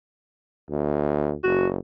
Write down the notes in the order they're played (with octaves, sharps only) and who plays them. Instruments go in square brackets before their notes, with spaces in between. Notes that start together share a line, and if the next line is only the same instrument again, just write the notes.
[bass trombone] D2
[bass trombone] F#1 [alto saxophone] F#4